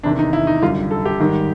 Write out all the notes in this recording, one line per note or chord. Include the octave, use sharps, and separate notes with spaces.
E2 C3 D#3 D4
D#4
E4
D#4
F#2 D3 G3 F4
A4
G4
G#2 D#3 G3